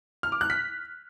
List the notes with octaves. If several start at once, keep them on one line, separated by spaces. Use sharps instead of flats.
F6
D6
F#6
B6